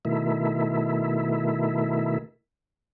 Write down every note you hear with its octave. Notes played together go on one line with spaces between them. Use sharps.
B2 D#3 A3 E4